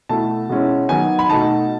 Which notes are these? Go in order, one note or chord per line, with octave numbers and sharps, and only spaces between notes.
B2 A3 E4 A5
B2 G#3 C#4 E4
D#3 F#3 B3 G#5
B5
B2 A3 D#4 A5